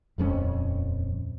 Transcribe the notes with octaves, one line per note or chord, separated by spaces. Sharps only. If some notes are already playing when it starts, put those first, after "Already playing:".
D#1 F2 G3 C#4